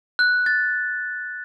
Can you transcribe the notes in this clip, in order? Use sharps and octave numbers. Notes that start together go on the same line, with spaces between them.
F#6
A6